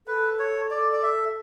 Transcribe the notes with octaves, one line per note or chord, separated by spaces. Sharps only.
A4 B4
C#5
A4 D5
D5
E5